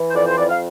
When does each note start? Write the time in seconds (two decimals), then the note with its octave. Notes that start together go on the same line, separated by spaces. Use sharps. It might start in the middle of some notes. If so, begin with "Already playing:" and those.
Already playing: E3
0.11 C5
0.15 F2 D5
0.27 C5
0.38 F2 D5
0.49 F5